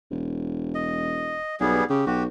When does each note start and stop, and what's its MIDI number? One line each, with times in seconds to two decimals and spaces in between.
0.11 1.42 28
0.75 1.55 75
1.60 1.82 35
1.60 1.84 55
1.60 1.84 59
1.60 1.84 68
1.90 2.02 49
1.90 2.06 67
2.06 2.27 35
2.06 2.23 66
2.06 2.23 67